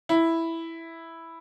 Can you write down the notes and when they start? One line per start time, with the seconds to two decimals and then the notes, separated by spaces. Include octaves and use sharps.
0.09 E4